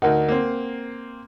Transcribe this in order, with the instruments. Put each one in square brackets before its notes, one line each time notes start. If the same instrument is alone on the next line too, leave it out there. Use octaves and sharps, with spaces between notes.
[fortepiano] D2 D#4 [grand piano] A#4 F#5
[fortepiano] A#3 C4